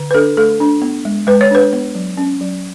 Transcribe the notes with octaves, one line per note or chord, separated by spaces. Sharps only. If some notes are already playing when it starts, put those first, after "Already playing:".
Already playing: D3
B4
D4 A4
A3 A4
D4
B3
G#3
G#3 B4
C#5
D4 B4
B3
F#3
C#4
F#3